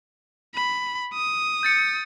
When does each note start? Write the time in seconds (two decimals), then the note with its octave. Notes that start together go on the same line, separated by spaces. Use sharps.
0.55 B5
1.14 D#6
1.63 G6 A6 C#7